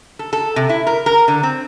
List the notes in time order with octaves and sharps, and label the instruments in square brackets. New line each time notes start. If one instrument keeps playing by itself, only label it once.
[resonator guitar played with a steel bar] A4
A4
C3
E4
A#4
A#4
D3
C4